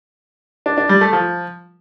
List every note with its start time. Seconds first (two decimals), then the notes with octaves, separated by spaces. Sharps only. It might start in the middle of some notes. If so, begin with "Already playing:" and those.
0.66 D4
0.78 D4
0.89 G3
1.01 A3
1.13 F3